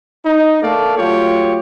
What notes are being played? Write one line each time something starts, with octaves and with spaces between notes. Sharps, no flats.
D#4
A3 A#3 A4 D5 F5
F#3 A3 F4 G4 C#5